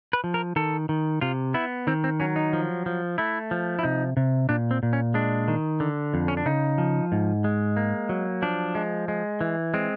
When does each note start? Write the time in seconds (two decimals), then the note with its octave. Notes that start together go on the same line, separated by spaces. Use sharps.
0.13 B4
0.24 F3
0.34 A#4
0.56 D#3 A4
0.89 D#3
1.21 C3 F4
1.54 B3 E4
1.87 D#3 C4
2.04 C4
2.20 F#3 C#4
2.36 D#4
2.53 F3
2.86 F3
3.18 A3 E4
3.51 F3
3.79 E4
3.83 C3 D#4
4.17 C3
4.49 A#2 D4
4.71 C4
4.83 A#2
4.93 C#4
5.14 G#3 D4
5.48 D#3
5.80 D3
6.14 F2
6.28 C#4
6.37 D4
6.46 C#3 D#4
6.78 F3
7.12 G#2
7.44 G#3
7.77 A#3
8.09 F#3
8.42 F3 D4
8.75 G#3
9.08 G#3
9.41 E3
9.74 G#3 C4